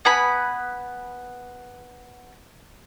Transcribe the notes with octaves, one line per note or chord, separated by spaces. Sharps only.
B3 G#5 B5